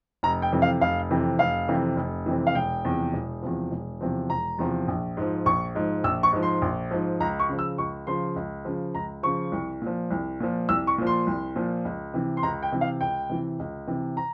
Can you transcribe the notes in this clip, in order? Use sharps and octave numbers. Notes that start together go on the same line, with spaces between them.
F1 A#5
G5
F2 C3 E3
F5
F1 F5
F2 C3 E3
F1 F5
F2 C3 E3
F1
F2 C3 E3
F5
E1 G5
E2 C3 F3
E1
E2 C3 F3
E1
E2 C3 F3
E1 A#5
E2 C3 F3
A#1
G#2 F3
A#1 C#6
G#2 F3
A#1 E6
C#6
G#2 F3
C6
A#1
G#2 F3
C#2 A#5
C#6
C#3 F3
E6
C#2 C#6
C#3 F3 C6
C#2
C#3 F3
C#2 A#5
C#3 F3 C#6
C2
A#2 F3
C2
A#2 F3
C2 E6
C#6
A#2 F3
C6
C2
A#2 F3
C#2
C3 E3
C6
C#2 A#5
G5
C3 E3
F5
C#2 G5
C3 E3
C#2
C3 E3
A#5